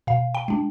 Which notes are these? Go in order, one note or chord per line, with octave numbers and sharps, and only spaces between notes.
B2 F5
G5
G#3 D4